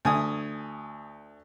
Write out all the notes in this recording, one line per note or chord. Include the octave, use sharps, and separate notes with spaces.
D2 G#5 D#6